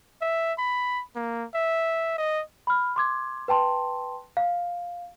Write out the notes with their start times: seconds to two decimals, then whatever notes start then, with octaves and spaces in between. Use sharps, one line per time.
0.21 E5
0.58 B5
1.16 A#3
1.54 E5
2.18 D#5
2.67 B5 F6
2.96 C6 D6 G#6
3.48 B4 G5 A5 C6
4.37 F5